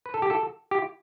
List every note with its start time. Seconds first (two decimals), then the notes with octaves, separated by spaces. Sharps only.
0.06 B4
0.14 A4
0.22 G4
0.30 A4
0.71 G4